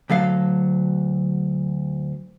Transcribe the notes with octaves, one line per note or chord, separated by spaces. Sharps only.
D2 F#3 A4 F5